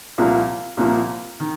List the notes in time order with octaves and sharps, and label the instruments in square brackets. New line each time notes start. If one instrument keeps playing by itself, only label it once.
[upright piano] C2 A#2 F3 A#3
C2 A#2 F3 A#3
D#3